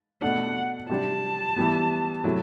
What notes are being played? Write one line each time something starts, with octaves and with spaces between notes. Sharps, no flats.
B2 A3 D4 F#5
C3 G3 D4 A5
E3 G3 B3
C3 F#3 A3 E4